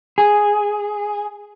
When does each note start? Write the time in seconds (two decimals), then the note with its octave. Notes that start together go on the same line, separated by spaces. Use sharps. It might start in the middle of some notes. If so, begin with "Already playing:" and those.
0.18 G#4